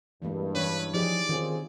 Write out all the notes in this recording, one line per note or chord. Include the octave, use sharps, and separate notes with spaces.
G2 E3 G#3 A#3
E3 C#4 B4 C#5
F3 D#4 G4 G#4 D5
D#3 C4 C#4 F4 G#4